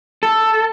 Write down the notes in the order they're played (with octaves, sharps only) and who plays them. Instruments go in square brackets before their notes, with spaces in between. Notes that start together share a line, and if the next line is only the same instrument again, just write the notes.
[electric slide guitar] A4